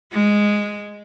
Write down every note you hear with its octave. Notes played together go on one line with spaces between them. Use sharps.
G#3